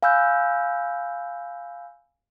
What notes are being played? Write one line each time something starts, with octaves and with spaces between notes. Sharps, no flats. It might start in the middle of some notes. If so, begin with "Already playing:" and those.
F5 G#5 B5 E6 F#6 G6